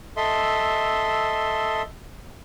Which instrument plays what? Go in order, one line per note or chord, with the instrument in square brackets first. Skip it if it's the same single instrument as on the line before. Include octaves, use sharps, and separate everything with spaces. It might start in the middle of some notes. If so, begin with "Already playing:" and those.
[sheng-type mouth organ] A4 D#5 E5 C6